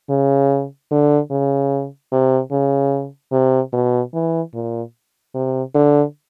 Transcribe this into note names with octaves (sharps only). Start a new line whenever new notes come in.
C#3
D3
C#3
C3
C#3
C3
B2
E3
A#2
C3
D3